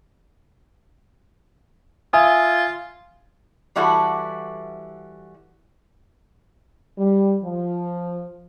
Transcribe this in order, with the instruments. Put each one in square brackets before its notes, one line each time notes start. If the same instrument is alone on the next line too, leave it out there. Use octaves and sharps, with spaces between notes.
[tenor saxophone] F4 [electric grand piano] E5 G#5 D#6
[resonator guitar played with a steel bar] E3 G3 E4 F#4 A4
[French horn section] G3
F3